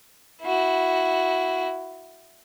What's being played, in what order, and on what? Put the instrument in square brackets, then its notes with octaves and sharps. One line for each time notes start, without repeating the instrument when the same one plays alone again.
[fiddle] E4 F#4